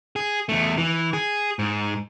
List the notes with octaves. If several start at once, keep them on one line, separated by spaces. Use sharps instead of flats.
G#4
E2 A3
E3
G#4
G#2